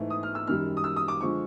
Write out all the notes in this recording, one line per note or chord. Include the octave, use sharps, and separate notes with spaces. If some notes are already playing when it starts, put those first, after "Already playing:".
Already playing: G#2 E3 A3
D#6
F6
E6
F#2 D#3 G3 F6
D#6
E6
D#6
D6
D3 F3 G#3 C#6